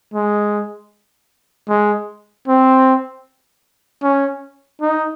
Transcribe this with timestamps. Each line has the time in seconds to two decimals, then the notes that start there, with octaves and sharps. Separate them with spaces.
0.14 G#3
1.69 G#3
2.48 C4
4.03 C#4
4.81 D#4